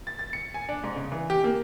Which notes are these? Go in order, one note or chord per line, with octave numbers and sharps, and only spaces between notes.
A6
A6
C#7
G#5
D4
G#2
C#3
E3
G4
A#3